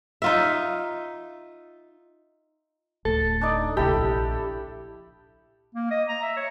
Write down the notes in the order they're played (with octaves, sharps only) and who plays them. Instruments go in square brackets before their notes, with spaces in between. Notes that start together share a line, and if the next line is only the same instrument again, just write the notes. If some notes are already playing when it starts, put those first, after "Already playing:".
[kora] D#4 F4 E5
[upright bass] D1 [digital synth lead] A4
[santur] D4 D#4 D5
[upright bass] D2 C3 [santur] E4 A4 B5 [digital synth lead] G4
[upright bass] A#1
[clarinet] A#3
D#5
A#5
E5
C#5